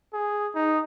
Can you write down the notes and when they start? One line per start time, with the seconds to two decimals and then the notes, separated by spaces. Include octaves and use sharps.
0.14 G#4
0.55 D#4